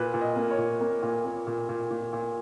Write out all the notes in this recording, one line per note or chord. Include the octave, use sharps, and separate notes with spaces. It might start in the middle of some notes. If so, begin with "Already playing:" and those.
Already playing: A#2 B4
A#2
D#5
A#3
C#5
A#2
A#3
A#2
A#3
A#2
A#2
A#2
A#2